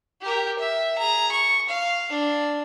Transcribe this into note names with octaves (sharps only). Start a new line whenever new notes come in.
G4 A#4
E5
G#4 A#5
C#6
F5
D4